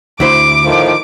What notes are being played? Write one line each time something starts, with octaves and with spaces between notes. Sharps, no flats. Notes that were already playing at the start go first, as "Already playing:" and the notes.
D2 E4 C5 D6
A2 D#3 F3